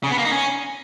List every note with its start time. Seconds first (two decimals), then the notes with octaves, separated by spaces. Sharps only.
0.03 C#3
0.11 B3
0.18 A#3
0.25 D#4
0.32 C#4